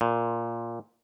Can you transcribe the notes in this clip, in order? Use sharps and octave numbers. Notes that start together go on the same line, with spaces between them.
A#2